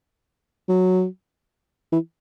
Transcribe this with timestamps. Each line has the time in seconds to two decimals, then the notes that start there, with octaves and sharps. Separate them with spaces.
0.69 F#3
1.92 E3